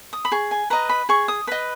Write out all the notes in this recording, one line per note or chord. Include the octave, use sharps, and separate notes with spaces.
D#6
B5
G#4 C#6
G#5
B4 D#5 A#5
B5
G#4 C#6
D#6
B4 D#5 B5